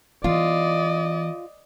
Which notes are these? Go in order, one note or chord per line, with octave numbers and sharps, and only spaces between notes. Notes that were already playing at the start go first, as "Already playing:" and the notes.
E3 B3 F4 D5 D#5